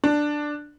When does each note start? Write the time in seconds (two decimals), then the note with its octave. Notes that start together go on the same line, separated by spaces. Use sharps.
0.04 D4